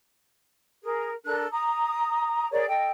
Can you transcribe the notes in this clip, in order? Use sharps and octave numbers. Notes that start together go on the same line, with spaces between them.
G#4 A#4
D4 A4 A#4 F#6
A#5 D#6
G#4 A#4 C#5 D5
A4 D#5 G5